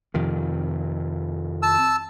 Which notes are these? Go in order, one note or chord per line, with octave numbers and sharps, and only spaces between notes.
F2 C3 D#3
A5 E6